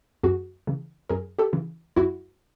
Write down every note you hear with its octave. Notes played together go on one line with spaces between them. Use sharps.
F#2 F#4 G#4
C#3 E3
F#2 G#4 A#4
G4 A4
C#3 E3
F#2 E4 F#4